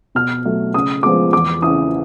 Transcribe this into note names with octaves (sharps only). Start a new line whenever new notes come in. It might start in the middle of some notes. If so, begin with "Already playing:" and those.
B2 F6
F#3 A3
C#3 D#6
F3 G#3 B3 D6
E2 D6
C#3 E3 D#6